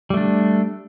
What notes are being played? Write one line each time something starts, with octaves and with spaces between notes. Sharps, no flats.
G3 A3 D4